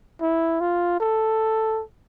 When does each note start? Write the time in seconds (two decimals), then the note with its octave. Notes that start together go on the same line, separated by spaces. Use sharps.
0.21 E4
0.60 F4
1.01 A4